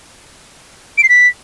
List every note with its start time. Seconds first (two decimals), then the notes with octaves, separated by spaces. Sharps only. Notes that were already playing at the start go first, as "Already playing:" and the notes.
0.98 D7
1.03 C7
1.09 B6